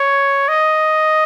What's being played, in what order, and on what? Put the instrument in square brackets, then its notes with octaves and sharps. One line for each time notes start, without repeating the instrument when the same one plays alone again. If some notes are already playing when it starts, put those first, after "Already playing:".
Already playing: [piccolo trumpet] C#5
D#5